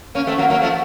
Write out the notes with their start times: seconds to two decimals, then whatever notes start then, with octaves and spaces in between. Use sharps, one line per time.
0.15 A#3 C#4
0.27 A3 C4
0.38 F#3 A#3
0.50 F#3 A#3
0.62 F3 A3